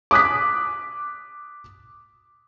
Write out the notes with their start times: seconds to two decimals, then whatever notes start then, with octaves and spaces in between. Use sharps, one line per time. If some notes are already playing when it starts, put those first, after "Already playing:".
0.11 D6 D#6 F#6 B6